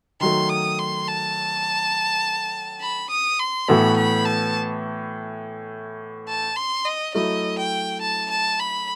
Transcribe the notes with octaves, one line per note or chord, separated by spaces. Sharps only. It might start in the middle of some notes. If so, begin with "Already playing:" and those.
D#3 F#3 A3 C6
D#6
C6
A5
B5
D#6
C6
A2 E3 B3 F#4 A4 B5
B5
A5
A5
C6
D#5
F#3 A3 E4 D#5
G5
A5
A5
B5